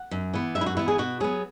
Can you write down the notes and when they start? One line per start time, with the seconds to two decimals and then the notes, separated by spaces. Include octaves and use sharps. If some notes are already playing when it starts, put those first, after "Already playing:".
Already playing: F#5
0.11 F#2
0.34 E3 B3
0.55 F#2 E5
0.61 E4
0.66 F#4
0.77 E3 B3 E4
0.88 G#4
0.98 B2 F#4
1.20 F#3 B3 G#4